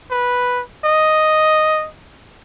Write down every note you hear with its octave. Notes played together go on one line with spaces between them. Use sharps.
B4
D#5